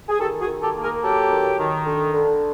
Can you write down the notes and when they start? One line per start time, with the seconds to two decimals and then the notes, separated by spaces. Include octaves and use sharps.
0.09 G#4
0.20 D#3 G4 A4
0.40 F#4 G#4
0.47 D#3
0.62 G4 A4
0.76 A#3
0.82 G#4 A#4
1.03 F#3 G4 A4
1.31 D#3
1.58 D#3
1.86 D3
2.14 D3